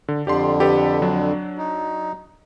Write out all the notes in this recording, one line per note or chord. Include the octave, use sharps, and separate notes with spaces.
D3
F2 D3 G4 D5 C6
G4 A4 B4
F#3 D4
D#4